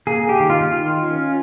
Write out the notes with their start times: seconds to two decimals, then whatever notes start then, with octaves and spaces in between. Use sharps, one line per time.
0.07 A#3 G#4
0.29 G4
0.40 D#3
0.50 F4
0.72 D#3
1.03 C#4